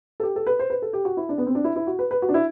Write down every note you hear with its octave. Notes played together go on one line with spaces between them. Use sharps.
A4
G4
A4
B4
C5
B4
A4
G4
F#4
E4
D4
B3
C4
D4
E4
E4
F#4
B4
B4
F#4
D4
E4